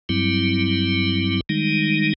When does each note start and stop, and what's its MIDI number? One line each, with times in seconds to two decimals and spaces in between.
0.09 1.41 43
0.09 1.41 54
0.09 1.41 55
0.09 1.41 60
0.09 1.41 64
1.49 2.13 51
1.49 2.13 55
1.49 2.13 56
1.49 2.13 63